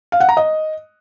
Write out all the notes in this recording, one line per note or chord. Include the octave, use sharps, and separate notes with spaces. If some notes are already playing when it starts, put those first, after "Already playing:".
F5
F#5
A#5
D#5